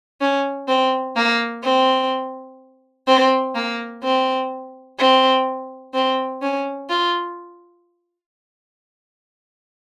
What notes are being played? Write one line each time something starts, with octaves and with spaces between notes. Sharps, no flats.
C#4
C4
A#3
C4
C4
A#3
C4
C4
C4
C#4
F4